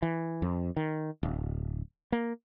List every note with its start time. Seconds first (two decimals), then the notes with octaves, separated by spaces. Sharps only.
0.02 E3
0.42 F2
0.77 D#3
1.23 D1
2.12 A#3